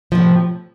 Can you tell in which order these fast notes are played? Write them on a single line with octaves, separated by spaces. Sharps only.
F3 C3 A2